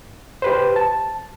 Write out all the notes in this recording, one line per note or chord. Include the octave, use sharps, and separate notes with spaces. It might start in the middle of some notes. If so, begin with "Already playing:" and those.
G4 B4 C5
A5